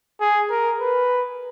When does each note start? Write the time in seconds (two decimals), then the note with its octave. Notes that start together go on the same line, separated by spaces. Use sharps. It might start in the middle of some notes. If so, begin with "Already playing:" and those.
0.21 G#4
0.51 A#4
0.81 B4